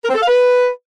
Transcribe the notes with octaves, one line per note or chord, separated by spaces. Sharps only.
A#4
C4
A4
F5
B4